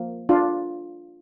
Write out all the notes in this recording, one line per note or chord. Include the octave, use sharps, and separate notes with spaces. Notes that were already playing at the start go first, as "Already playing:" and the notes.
Already playing: F3 A#3
D4 F4